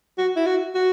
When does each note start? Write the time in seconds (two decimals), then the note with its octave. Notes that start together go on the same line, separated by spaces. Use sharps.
0.18 F#4
0.36 E4
0.46 F#4
0.75 F#4